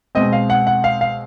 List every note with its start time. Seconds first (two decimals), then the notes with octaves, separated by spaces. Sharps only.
0.15 B2 G#3 C4 D#5
0.33 F5
0.50 F#5
0.67 F#5
0.84 F5
1.01 F5